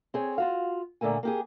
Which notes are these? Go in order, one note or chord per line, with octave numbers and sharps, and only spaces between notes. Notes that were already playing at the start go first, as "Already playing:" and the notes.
C4 G#4 C#5
F4 F#4 F5
A#2 D3 A3 A#3 G#5
A#3 G4 G#4